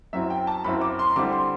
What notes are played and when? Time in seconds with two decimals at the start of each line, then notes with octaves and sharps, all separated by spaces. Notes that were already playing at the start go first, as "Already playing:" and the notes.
0.13 F#2 F#3 C4 E4 E5
0.30 G5
0.47 A5
0.64 F#2 F#3 C4 E4 B5
0.81 D6
0.99 C6
1.16 D3 G3 C4 E4 D6
1.32 C6